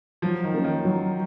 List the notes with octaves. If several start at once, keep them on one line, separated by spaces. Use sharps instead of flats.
F3 F#3
D#3
A#3 C#4
D#3
F#3